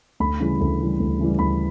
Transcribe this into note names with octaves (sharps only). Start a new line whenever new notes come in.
D2 B5
C#3 E3 G3
D2
C#3 E3 G3
D2
C#3 E3 G3
D2 B5